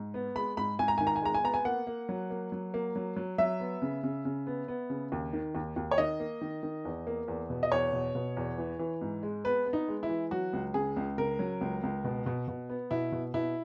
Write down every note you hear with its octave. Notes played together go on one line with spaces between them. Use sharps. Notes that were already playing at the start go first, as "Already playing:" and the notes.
Already playing: G#2
B3
G#3 B5
G#2 B5
G#2 G#5
A#5
D#3 G#5
A#5
G#5
G#3 A#5
G#5
B3 A#5
G#5
A#3 F#5
A#3
F#3
A#3
F#3
A#3
F#3
F#3
F#3 E5
B3
C#3
C#3
C#3
B3
B3
C#3
D#2
D#3
D#2
D#2
C#5
D#3 D#5
A#3
D#3
D#3
E2
A#3
E2
B2
D#5
E2 C#5
B2
B2
E2
E3
E3
G#2
G#3
B3 B4
B3
D#4
G#3
E4
E3
F#3 F#4
C#2
C#3 G#4
C#2
C#3 A#4
F#3
C#2
C#2
B2
B2
B2
B3
B2 E4
B2
B2 E4